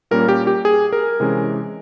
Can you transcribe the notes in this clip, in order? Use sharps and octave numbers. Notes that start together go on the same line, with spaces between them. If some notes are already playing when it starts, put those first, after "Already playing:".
A#2 G3 A#3 C#4 A#4
G4
G4
G#4
A#4
C3 E3 G#3 C#4